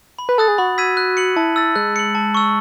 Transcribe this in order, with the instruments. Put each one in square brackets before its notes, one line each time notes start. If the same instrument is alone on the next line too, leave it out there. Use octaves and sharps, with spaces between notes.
[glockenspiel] B5
[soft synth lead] B4
[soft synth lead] A4 [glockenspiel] D#6 F#6 A6
[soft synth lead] G#4
[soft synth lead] F#4 [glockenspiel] B5
[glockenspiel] E6 G#6 B6 D#7
F#6
C#7 F#7
[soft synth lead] E4 [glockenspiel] A5
[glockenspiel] E6 A6
[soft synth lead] G#3 [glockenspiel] F#6
[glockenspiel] C#7 F#7
A5
C#6 E6